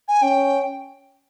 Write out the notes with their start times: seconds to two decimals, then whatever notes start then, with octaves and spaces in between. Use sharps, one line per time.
0.08 G#5
0.22 C#4 G5